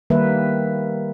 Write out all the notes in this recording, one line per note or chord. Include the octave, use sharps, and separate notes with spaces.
D#3 G3 A#3 B4 E5